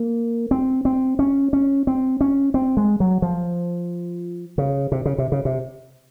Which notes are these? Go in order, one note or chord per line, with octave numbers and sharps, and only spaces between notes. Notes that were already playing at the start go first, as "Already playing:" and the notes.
Already playing: A#3
C4
C4
C#4
C#4
C4
C#4
C4
G#3
F#3
F3
C#3
C3
C#3
C3
C#3
C3